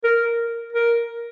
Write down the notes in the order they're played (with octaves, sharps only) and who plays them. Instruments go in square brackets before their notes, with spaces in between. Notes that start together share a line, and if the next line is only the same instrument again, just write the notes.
[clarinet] A#4
A#4